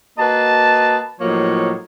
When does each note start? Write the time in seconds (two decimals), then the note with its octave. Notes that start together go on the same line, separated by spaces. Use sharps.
0.18 A#3 F#4 B4 D#5 A5
1.21 A2 F3 F#3 A#3 D#4 C#5